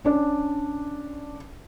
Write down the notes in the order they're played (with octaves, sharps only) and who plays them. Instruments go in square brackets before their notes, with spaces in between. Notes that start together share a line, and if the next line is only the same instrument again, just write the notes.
[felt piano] C#4 D4 D5